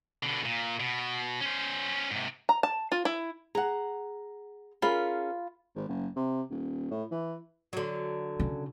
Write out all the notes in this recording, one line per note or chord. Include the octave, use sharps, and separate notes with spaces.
B2 D3
A#2
B2
C#4 C5
G#2 C3
A#5
A5
F4
E4
G#4 F#5 A#5
C#4 F4 G#4 A#4 B5
G#1
F#1
C3
D#1
A2
E3
D3 F#3
C#3